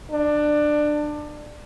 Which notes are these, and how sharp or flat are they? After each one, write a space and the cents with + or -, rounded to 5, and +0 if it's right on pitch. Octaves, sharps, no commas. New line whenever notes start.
D4 +20